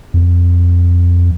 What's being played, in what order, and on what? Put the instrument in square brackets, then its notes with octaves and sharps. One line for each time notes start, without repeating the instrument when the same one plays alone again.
[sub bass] F2